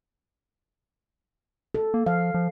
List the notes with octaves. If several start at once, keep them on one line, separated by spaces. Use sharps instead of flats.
A4
A#3
F3 F5
F3